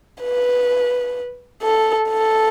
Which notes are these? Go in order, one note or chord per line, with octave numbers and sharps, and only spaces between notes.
B4
A4
A4